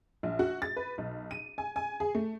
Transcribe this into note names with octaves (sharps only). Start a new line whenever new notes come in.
A#1
F#4
A6
B4
B1
D#7
G#5
G#5
G#4
A3